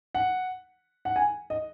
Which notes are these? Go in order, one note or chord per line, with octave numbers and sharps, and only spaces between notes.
F#5
F#5
G#5
D#5